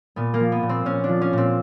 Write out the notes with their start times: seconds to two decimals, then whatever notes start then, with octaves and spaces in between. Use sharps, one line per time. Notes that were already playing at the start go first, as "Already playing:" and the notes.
0.16 A#2 B3
0.34 A#3
0.40 F3
0.52 B3
0.63 A#2
0.69 C4
0.85 A#2 C#4
1.04 D4
1.09 F3
1.21 C#4
1.33 A#2 C4